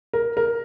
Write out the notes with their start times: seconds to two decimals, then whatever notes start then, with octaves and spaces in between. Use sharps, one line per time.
0.13 A#4
0.37 A#4